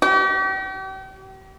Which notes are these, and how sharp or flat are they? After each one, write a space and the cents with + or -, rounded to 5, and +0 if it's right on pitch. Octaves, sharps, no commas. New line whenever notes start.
G4 -40